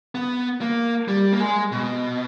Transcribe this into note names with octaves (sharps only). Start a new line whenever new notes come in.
B3
A#3
G3
A#3
G#3
B2